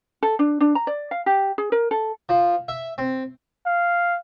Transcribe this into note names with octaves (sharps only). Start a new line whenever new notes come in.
A4
D4
D4
A#5
D5
F5
G4
G#4
A#4
A4
F3
E5
C4
F5